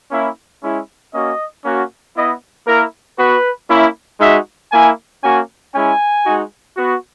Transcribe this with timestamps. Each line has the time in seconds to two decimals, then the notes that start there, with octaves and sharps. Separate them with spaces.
0.11 A#3 C#4 E4
0.62 G#3 C#4 E4
1.13 A#3 C#4 F#4 D#5
1.65 A#3 C#4 F#4
2.16 B3 E4 D#5
2.67 A#3 E4 A#4
3.18 B3 F#4 B4
3.70 A#3 C#4 E4
4.20 G#3 D#4 F#4 E5
4.72 A#3 E4 G#5
5.23 A#3 C#4 F#4 G#5
5.74 G#3 C#4 E4 G#5
6.26 G#3 D#4 F#4
6.77 B3 F#4